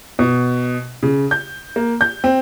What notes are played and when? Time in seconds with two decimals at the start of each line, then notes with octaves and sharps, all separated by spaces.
0.19 B2
1.03 C#3
1.31 G6
1.76 A#3
2.01 G6
2.24 C4